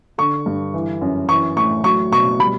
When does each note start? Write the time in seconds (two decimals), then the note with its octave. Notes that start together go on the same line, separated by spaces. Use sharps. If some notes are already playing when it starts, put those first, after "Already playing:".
0.18 D3 C#6
0.46 G2
0.74 E3
1.01 F#2
1.29 E3 C#6
1.56 A2 C#6
1.84 F#3 C#6
2.12 B2 C#6
2.39 G3 B5